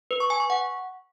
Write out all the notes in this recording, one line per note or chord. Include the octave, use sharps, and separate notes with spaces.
B4
C#6
G#5
C#6
F#5